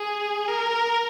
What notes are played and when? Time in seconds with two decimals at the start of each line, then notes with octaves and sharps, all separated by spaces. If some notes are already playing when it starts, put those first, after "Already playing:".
Already playing: G#4
0.49 A#4